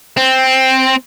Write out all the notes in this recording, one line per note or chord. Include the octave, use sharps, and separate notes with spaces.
C4